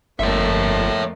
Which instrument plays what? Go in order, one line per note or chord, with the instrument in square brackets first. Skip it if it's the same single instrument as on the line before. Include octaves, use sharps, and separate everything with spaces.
[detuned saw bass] G1 [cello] F2 F3 [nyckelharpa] A3 A#3 [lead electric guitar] C#5 E5